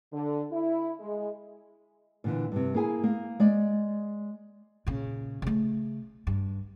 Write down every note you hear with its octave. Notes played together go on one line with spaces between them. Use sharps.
D3
E4
G#3
A#2 D3 E3
G2 C3
A#3 E4 G#4 G#5
A#3
G#3 D5
A#2 C#3
C#3 A3
G2